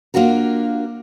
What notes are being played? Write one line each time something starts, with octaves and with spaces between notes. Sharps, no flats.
A#3 D4 F4 F#4 A#4